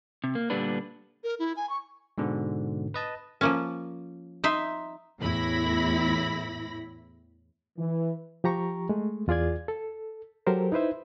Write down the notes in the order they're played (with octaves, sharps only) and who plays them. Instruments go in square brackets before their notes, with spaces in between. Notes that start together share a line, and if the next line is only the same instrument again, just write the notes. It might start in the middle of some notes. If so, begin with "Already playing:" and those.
[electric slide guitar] C3
A#3
A#2 D3 G3 B3 D4 B4
[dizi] A#4
E4
G#5
C#6
[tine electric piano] G#2 B2 D3
B4 D#5 A5
[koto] F3 A#3 C#4
[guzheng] D#4 E5 C6
[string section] E2 A2 E4 B5 A#6
[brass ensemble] E3
[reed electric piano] F3 G4 A#5 C#6
G#3 A3
E2 F4 G#4 D5 G#6
A4
F#3 G4 A4 A#4 C5
D#4 E4 B4 C5 E5